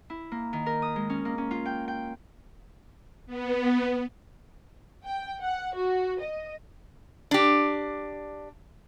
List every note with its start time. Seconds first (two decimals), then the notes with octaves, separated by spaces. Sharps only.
0.10 E4
0.32 A#3
0.53 D#3
0.66 A#4
0.82 D#6
0.96 G#3
1.10 C#4
1.25 A#3
1.38 C#4
1.51 F4
1.65 G5
1.88 G5
3.26 B3
5.04 G5
5.41 F#5
5.75 F#4
6.21 D#5
7.31 D4 G4